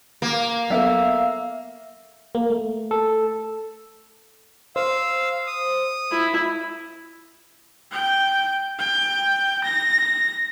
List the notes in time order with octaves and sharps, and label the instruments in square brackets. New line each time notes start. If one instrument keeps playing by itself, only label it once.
[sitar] A#3
[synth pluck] F#3 B3 A4 [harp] E5 [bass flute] F5
[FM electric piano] A#3
A3
[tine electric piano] A4
[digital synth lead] C5 [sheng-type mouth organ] F5 E6
[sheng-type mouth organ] D#6
[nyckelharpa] E4
[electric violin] G5
G5
A#6